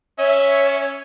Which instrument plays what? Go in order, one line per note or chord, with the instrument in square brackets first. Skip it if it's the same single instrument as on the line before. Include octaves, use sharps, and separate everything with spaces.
[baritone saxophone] C#4 [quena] C#5 [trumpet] E5